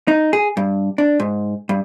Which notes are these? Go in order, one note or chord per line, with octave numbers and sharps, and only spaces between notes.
D#4
G#4
G2
D4
G#2
G2